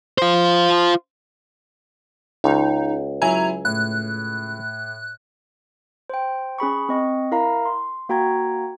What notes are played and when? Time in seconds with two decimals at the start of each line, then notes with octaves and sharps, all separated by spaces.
0.18 F4 C5
2.44 C#2 D#4
3.22 F#3 E4 G#5 A#5
3.65 A2 F#6
6.10 C5 G5
6.59 C#4 G#4 B5 C#6
6.89 C4 D#5 C#6
7.32 E4 A#4 F5 A#5
7.65 C6
8.09 A#3 F#4 G5 A#5 G#6